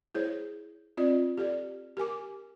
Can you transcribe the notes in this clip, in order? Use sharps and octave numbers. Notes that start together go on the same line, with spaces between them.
E4 G#4 C5 C#5
C4 F4 D5 D#5
G4 A4 D5
G4 A#4 G#5 D6